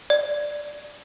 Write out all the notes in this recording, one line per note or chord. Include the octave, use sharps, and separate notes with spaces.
D5